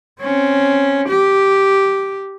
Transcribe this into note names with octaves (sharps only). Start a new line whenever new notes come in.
C4 C#4
G4